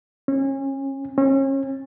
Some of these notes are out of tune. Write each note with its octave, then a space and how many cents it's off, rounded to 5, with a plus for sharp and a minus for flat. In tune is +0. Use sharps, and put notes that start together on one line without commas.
C#4 -30
C#4 -35